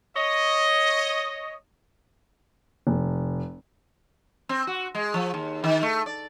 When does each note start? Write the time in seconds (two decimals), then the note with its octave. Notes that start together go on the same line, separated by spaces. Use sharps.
0.16 C#5 D#5
2.87 F1
4.49 C4
4.67 F#4
4.95 G#3
5.14 F3
5.34 D#2
5.64 D#3
5.83 A3
6.06 D5